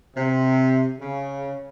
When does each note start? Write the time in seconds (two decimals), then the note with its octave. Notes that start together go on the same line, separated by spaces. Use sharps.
0.16 C3
0.99 C#3